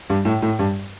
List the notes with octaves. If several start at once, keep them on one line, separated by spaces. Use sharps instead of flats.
G2
A2
A2
G2